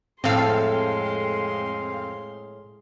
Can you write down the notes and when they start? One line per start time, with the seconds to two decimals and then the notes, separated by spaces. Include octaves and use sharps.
0.24 F2 A2 G#3 C4 A4 F5 C6